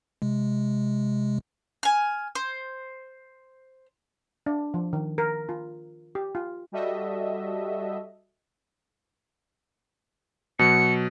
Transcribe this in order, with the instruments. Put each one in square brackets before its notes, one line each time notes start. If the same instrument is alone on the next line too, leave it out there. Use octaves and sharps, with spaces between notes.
[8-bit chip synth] C3 G#3
[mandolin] G#5 F6
C5
[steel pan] D4
F3
D#3
A#4
F4
G4
F4
[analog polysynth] G3 F#4 A4 D#5 E5
[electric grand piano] B2 F#3 [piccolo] C#7